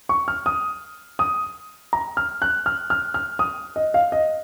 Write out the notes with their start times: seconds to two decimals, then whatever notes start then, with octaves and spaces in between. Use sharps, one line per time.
0.09 C#6
0.28 F6
0.46 D#6
1.19 D#6
1.93 A#5
2.17 F6
2.42 F#6
2.66 F6
2.90 F6
3.14 F6
3.39 D#6
3.76 D#5
3.94 F5
4.12 D#5